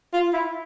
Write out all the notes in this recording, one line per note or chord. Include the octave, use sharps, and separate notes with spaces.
F4
E4